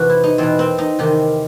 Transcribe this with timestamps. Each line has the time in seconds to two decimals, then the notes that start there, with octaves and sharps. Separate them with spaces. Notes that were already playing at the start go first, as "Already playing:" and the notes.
Already playing: E2 C3 E3 F#4 C5
0.09 E4
0.24 D#4
0.38 E2 B2 C4
0.59 C4
0.78 D#4
0.99 E2 C3 D#3 G4